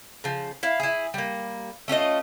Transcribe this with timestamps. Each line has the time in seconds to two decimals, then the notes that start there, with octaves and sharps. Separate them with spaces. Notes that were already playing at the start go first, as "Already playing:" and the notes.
0.24 C#3 F3
0.63 E4 F5
0.80 E4 G#4
1.14 G3 A#3
1.88 A3 C#4 F4 D#5